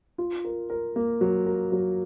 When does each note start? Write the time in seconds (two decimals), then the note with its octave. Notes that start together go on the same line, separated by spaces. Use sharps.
0.18 F4
0.45 A#4
0.70 A#4
0.96 A#3
1.21 F#3
1.46 A#4
1.72 F#3